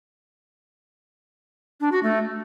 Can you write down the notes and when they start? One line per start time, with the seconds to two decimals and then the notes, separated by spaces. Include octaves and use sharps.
1.81 D4
1.92 F#4
2.03 A3